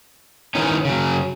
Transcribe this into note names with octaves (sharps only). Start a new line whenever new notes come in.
D#3 E3 C#4 D#4
C#3 F#3